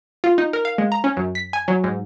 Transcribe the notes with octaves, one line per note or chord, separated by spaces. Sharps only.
F4
D#4
A#4
F5
G#3
A#5
C#4
F#2
B6
G#5
F#3
G#2